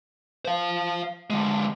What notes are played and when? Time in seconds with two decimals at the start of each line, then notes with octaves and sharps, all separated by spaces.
0.45 C5 F5
1.30 D3 G#3